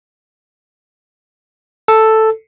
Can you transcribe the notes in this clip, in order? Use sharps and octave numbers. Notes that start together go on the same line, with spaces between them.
A4